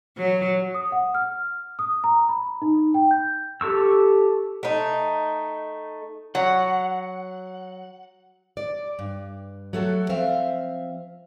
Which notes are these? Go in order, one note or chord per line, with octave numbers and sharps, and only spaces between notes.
F#3
D#6
F#5
F6
D#6
A#5
B5
D#4
G5
G6
G4 A4 C#6 E6
A3 D#4
F#3 F#5
D5
G2
F#3 A3 F#4 A4
F3 C4 C5 E5 F5